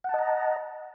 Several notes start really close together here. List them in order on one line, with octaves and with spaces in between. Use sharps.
F#5 A5 D#5 A#5